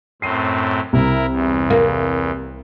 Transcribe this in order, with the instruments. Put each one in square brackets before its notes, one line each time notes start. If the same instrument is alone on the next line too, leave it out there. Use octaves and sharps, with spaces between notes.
[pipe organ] F#2 A2 C4 [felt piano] C7 D#7
[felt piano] C2 [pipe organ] E4 A#4
[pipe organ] E2
[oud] A#3